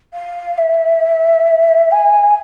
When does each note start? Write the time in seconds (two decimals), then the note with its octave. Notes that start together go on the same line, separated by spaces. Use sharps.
0.13 F5
0.57 E5
1.91 G#5